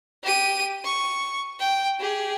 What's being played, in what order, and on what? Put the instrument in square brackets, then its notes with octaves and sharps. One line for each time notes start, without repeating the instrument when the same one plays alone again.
[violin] G4 D#7
C#6
G5
G4 G#4